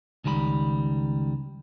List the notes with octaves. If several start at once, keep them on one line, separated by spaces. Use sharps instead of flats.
C#2 D#3 G3 A#4 B5